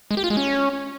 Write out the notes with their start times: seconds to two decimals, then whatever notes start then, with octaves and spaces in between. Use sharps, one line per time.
0.11 G#3
0.17 G4
0.24 F4
0.30 G#3
0.37 C#4